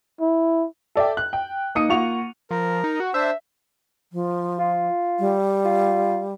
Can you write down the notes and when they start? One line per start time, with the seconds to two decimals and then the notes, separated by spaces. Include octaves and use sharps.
0.21 E4
0.96 A4 D5 E5 G5
1.17 F#6
1.33 G5
1.75 A#3 D#4 D#6 C#7 D#7
1.89 A#3 F4 F#5 C#6 F7
2.51 F3 A#4
2.84 D#4
3.00 F#4
3.14 D4 C5 E5
4.13 F3
4.59 F4
5.20 G3
5.64 F4